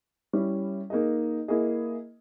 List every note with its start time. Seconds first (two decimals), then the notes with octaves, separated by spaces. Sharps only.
0.33 G3 C#4 E4
0.90 A#3 D#4 G#4 D#5
1.48 A#3 E4 G#4 D#5